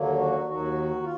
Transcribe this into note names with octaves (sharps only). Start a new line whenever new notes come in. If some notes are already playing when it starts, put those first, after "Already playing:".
Already playing: D#2 D3 F#3 A#3
F#4
D#2 D#3 F#3 F#4
F4